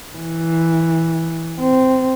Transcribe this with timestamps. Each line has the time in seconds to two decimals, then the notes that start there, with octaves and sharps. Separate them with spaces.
0.16 E3
1.60 C4